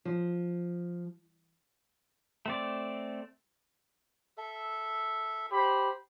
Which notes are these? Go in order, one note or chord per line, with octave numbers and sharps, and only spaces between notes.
F3
A3 C4 D5
A4 E5
G4 C5 B5